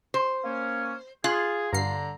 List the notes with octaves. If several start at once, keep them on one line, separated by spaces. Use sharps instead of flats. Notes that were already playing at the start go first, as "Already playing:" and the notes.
C5
A#3 C#4
F4 G#4 F#6
G2 D3 A#5 C7